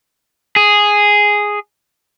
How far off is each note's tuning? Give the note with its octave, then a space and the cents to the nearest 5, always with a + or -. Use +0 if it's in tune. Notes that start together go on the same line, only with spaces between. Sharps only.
G#4 -5